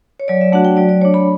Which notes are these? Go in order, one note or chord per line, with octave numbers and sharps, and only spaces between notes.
C#5
F#3 D5
E5
A3 D4 F#4 F#5
G5
F#3 D5
D5
A3 D4 C#5
B5